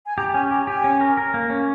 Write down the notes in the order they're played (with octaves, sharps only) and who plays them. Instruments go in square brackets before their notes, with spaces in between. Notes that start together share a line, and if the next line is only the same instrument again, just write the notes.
[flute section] G#5
[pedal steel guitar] G4 [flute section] A#5
[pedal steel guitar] C#4 [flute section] G#5
[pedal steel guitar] G4 [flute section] A#5
[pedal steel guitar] G4 [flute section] G#5
[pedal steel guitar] C#4
A#4
A#4
A#3
C#4